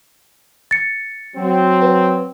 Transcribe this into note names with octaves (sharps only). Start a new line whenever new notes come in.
A6 C#7
F#3 C4
B4